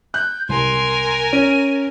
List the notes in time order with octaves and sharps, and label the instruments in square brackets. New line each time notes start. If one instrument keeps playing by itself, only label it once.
[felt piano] F#6 [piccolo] G6
[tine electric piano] C2 [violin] A#4 G#5 [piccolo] C6
[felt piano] C#4 [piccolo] D#7